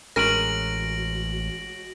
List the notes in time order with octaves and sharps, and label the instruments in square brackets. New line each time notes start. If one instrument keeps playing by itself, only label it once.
[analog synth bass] A1 [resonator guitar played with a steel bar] G#3 C#4 A#4 [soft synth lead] F#4 [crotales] A#6 D7 F#7